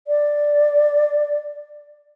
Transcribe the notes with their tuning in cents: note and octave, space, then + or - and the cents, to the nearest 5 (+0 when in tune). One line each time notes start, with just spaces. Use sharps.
D5 +5